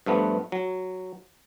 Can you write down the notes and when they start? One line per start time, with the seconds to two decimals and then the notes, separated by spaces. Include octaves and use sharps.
0.06 G2 F3 A3 B3
0.52 F#3